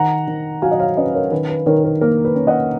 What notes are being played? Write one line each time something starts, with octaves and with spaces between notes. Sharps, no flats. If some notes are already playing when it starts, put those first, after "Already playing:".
Already playing: D#3 F#5 A#5
D#3
F#3 F5 G#5
D#5
C#5 F5
C#4 B4 D#5
A#4 C#5
D#3 B4
B4
D#3 A#4 C#5
A#4
A#3 A#4
B4
C#4
D#5 F#5